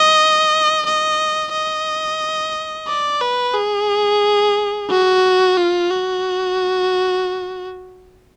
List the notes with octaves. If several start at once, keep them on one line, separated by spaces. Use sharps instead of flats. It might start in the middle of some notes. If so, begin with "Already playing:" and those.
Already playing: D#5
D#5
D#5
D5
B4
G#4
F#4
F4
F#4